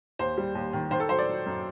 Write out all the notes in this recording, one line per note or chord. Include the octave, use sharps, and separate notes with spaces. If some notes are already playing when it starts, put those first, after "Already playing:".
D#2 C5
G3
D#2
D#3
D#3 C5
A4
F#3 C5
D5
F#3
F#2